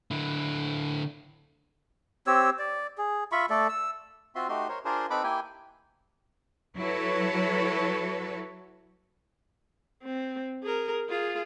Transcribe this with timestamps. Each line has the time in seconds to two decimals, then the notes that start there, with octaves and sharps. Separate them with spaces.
0.11 D3 E4
2.27 C4 G4 C#5 E6
2.59 D5
2.98 G#4
3.32 F4 E5 B5 C#6
3.50 A3 A4 D5
3.69 E6
4.35 C4 F4 F#4 E5 C6
4.49 A3 D#4 F#4 G4 C6
4.69 A#4 C5 C#5
4.85 D4 F4 G#4 A#4 C5
5.10 C4 D#4 A4 B4 B5 D6
5.23 A#3 E4 G4 G5 G#5
6.76 F#3 E4 F#4 A4 B4 C#5
10.04 C4
10.63 G#4 A#4
11.09 F4 G#4